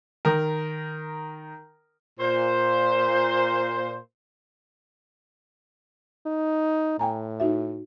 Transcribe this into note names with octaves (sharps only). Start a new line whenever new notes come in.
D#3 A#4
A#2 C5
D#4
A2 G5 G#5 A#5
D#4 F#4 E5